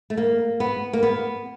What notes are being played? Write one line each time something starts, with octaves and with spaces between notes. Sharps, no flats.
A3
A#3
B3
A#3
B3